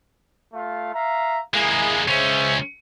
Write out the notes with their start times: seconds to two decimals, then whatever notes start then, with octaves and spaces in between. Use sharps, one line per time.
0.54 A3 F4 F5
0.94 E5 F5 A#5
1.54 G#3 A#3 E4 G#4
2.08 C#2 C#4 G#4 C5 E5